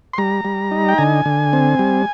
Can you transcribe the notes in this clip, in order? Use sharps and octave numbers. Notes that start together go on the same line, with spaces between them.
C6
G3 A#5
G3
D#4
G5
D3 G#5
D3
C4
G3